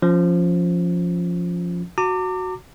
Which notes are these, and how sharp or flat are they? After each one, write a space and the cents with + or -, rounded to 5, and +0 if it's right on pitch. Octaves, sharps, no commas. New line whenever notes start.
F3 +0 C#4 +0
F#4 +0 A#5 -45 D6 +5